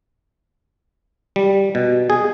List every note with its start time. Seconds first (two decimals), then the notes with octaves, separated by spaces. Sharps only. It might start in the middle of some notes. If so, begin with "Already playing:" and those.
1.36 G3
1.75 B2
2.10 G#4